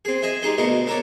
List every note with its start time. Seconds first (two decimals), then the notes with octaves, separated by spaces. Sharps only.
0.05 C4 G#4
0.22 G#4 D#5 E5 G#5
0.42 G3 G#3 D#4 G#4 C5
0.58 D2 B2 A3 A#4 D#5
0.86 B3 A4 A#4 C#5 D5